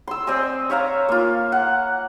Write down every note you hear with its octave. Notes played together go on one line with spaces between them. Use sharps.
C6 E6
C4 D5 D#5 G#5
C#5 E5 F5 A#5
A#3 F4
F#5